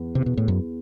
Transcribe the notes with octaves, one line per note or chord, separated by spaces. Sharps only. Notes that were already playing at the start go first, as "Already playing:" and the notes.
Already playing: E2
C3
B2
A2
F#2